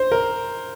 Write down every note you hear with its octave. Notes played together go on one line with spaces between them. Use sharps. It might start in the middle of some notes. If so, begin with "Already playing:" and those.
Already playing: C5
A#4